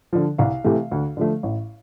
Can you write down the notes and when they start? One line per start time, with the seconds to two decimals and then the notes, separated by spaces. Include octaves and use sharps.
0.13 D3 F3
0.38 C2 F5
0.64 C3 E3 A3
0.91 D2
1.17 D3 F3 A3
1.43 A1